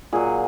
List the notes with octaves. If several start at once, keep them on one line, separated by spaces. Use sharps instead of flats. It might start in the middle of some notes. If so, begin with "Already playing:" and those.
A#2 F#3 G#4